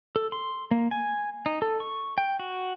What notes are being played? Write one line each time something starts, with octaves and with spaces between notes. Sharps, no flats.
A4
C6
A#3
G#5
D#4
A4
C#6
G5
F#4